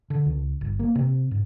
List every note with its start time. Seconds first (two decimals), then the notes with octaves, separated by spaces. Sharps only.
0.10 D3
0.26 C#2
0.61 G1
0.79 A#3
0.95 C3
1.31 G#2